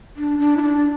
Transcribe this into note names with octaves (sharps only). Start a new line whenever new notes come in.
D4
D4
E4
D4